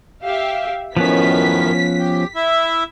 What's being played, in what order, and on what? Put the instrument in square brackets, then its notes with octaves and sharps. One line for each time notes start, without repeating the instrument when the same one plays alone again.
[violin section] G4 E5 F5
[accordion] F#2 A2 D#3 [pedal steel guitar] F3 B3 C#4 [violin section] B6
[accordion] G4
E4 E5